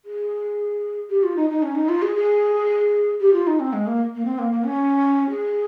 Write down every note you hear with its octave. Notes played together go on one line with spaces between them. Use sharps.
G#4
G4
F4
D#4
D#4
C#4
D#4
F4
G#4
G#4
G4
F4
D#4
C4
G#3
A#3
A#3
C4
A#3
A#3
C#4
G#4